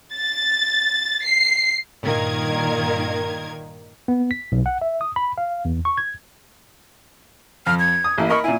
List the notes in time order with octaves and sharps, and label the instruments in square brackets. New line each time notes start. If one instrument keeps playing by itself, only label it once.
[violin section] A6
C7
[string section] G2 A#2 D#3 A#4 G#6
[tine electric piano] B3
B6
B1
F#5
E5
D#6
B5
F5
E2
C#6
G#6
[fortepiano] F2 [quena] F6
[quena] G#6
[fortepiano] D#6
A1 A#3 E4
[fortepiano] A#4 D#5 B5 [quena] C#6
[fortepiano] A#2 E4 [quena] G#5